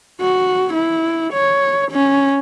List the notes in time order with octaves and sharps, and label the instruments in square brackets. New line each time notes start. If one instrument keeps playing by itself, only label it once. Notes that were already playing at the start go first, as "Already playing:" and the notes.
[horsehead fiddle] F#4
E4
C#5
C#4